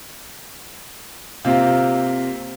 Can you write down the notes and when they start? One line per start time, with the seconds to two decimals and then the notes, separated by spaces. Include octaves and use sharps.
1.45 C3 A#3 C4 F4